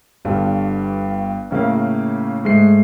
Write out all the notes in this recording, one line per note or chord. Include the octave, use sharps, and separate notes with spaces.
G1 G2 D4 F4 A4
A2 C#3 A#3 F5
G#2 G#3 A3 C7